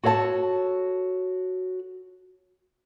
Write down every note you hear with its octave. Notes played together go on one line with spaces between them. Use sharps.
F#4 A4 C#5 F5 A5